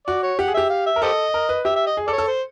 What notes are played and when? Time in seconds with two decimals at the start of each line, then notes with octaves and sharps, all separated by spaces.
0.07 F#4 D5
0.23 C#5
0.39 G4 F#5
0.48 G#4
0.54 G4 E5
0.70 F5
0.86 E5
0.96 A#4
1.02 G4 A4 C5 D#5
1.34 A#4
1.49 B4
1.65 G4 E5
1.76 E5
1.87 D#5
1.97 G#4
2.07 A4 D5
2.13 C#5
2.18 A4
2.28 C5